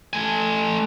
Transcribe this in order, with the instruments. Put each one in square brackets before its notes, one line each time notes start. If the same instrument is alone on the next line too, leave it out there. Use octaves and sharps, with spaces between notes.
[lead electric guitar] A3 G#5